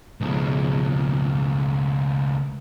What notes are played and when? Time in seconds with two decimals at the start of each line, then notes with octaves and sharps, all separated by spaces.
0.21 C#2 B2